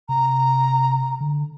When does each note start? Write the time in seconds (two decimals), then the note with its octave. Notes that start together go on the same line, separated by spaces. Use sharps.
0.09 C3 A#5
1.20 D3